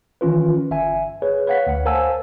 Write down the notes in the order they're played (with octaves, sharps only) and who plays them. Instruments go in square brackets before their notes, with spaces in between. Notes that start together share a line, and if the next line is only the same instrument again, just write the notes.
[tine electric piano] D#3 E3 C#4 F4 B4
G1 E5 G#5
G#4 B4 C#5
B4 C#5 F5 F#5 B6
D2 F#5
A#4 C5 F5 G#5 A5 E6